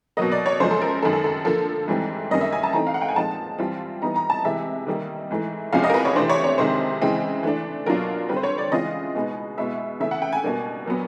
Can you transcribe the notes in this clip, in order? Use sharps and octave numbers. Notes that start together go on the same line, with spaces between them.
B2 F#3 A#3 D#5
D5
C#5
F#2 C#3 F3 G#3 C5
A4
A#4
F#2 D#3 G#3 A4
A4
A4
D3 F3 A#3 A4
G#2 E3 G3 C4
F#2 D#3 G3 A#3 C#4 D#5
E5
G#5
A5
E3 A3 C4 D#4 A#5
F5
F#5
G5
G#5
A#2 F3 G#3 C4 D#4 A5
E3 G3 C4 F4
E3 G3 B3 D#4 A#5
A#5
A5
C3 E3 G#3 E5
D#3 G3 A#3 D#4
G#2 E3 A3
E2 C3 F3 G#3 C#4 F5
D#5
A#4
B4
C#5
C3 E3 A3 D4 C5
C#5
C#5
F2 C3 D#3 G#3 C5
C#3 E3 G#3 C4
E3 A3 D4
B2 F#3 A#3 D4 F4 A#4
D3 G3 C4 B4
C5
C#5
D5
C#3 E3 G#3 C4 F4 D#5
B2 G#3 B3 D#4
B2 G#3 B3 E4 E5
C#3 E3 A3 C#4 E5
F#5
G5
G#5
B2 G3 A#3 D4
A#2 F#3 B3